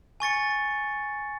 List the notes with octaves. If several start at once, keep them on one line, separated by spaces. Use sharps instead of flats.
G#5 C#6 A6 C#7